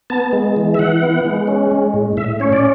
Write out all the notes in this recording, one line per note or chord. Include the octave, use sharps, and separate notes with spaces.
B3 A5
G#3
E3
E5
E3 F#5
B3
G#3
C#4
G#3
A2
A2 E5
C#4 C#5
D5